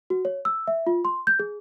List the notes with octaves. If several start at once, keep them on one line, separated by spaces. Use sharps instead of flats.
F#4
C#5
E6
E5
F4
C6
G6
G#4